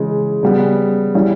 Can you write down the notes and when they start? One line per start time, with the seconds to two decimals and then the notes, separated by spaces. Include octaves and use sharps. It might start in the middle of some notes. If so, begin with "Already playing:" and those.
Already playing: C#3 E3 G#3
0.43 C#3 G3 B3
1.14 G3 C#4 E4